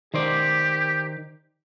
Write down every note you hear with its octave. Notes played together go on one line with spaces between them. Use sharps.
D#3 G4 C5 D5